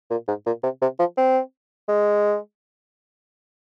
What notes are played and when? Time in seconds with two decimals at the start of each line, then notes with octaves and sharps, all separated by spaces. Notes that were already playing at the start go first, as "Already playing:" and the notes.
0.11 A#2
0.28 G#2
0.46 A#2
0.63 C3
0.82 C3
0.99 F3
1.18 C4
1.89 G#3